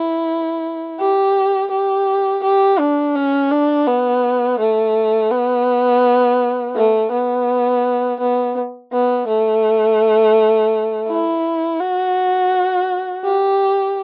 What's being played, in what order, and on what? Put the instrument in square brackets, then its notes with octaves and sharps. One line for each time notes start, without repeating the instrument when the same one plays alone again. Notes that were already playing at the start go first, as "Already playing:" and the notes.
Already playing: [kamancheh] E4
G4
G4
G4
D4
C#4
D4
B3
A3
B3
A3
B3
B3
B3
A3
E4
F#4
G4